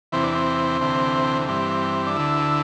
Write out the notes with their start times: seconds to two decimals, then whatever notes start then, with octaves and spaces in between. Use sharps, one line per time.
0.12 E2 C3 E3 C4
0.23 D4
0.35 C4
0.80 D2 C3 E3
1.48 G2 E3 C4
2.06 D4
2.16 D2 D3 E4